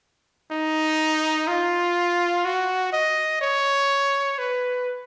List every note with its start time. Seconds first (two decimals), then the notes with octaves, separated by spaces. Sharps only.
0.51 D#4
1.48 F4
2.45 F#4
2.93 D#5
3.41 C#5
4.38 B4